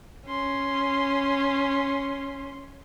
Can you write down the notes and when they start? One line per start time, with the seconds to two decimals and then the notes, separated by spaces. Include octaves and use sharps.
0.26 C#4 C6